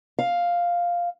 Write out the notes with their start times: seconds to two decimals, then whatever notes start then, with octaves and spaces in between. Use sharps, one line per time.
0.19 F5